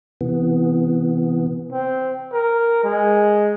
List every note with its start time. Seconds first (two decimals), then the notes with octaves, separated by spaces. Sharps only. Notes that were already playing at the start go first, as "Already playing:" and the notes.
0.21 C3 E3 B3
1.72 C4
2.32 A#4
2.84 G#3